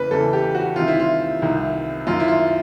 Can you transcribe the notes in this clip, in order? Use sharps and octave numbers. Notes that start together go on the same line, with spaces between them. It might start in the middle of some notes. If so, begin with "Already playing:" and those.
Already playing: E2 C#3 E3 B4
E2 C#3 E3 A4
G4
F#4
C2 C3 D#3 F4
E4
F4
C2 C3 D#3
F#2 D#3 F4
E4
F4